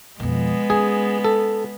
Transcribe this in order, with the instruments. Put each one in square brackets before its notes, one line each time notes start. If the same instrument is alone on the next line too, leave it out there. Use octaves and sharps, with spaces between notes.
[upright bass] F2 B2 [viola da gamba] G#3 B3
[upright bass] C#4 [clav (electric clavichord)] G#4
[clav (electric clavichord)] A4